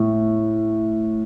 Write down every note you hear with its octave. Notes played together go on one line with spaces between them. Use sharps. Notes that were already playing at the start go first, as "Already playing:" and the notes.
Already playing: A2